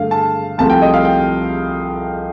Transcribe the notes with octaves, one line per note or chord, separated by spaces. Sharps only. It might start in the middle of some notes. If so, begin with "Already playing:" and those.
Already playing: G2 D3 A3 F5
A5
C2 C3 F3 A3 A5
G5
D#5
F5
G5